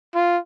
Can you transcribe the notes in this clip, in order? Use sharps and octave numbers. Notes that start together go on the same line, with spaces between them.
F4